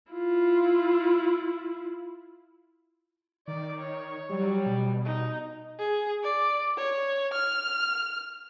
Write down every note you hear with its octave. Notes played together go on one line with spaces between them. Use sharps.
E4 F4
D#3 D5
C#5
F#3 G3
B2
D#4
G#4
D5
C#5
F6